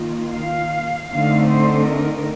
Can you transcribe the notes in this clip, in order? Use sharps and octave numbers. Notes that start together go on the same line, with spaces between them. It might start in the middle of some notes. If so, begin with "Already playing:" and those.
Already playing: D#3 A#3 F4
F5
D3 A3 C4 D#4 F5
C5
A#4